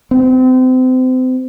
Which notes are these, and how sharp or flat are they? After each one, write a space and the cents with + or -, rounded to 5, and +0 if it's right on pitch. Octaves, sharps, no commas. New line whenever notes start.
C4 -35